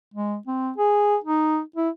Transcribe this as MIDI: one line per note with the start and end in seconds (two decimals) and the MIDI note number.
0.14 0.37 56
0.47 0.71 60
0.78 1.16 68
1.24 1.61 63
1.76 1.90 64